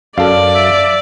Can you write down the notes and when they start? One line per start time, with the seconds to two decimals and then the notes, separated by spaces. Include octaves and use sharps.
0.18 F#2 A4 D5 F5
0.55 E5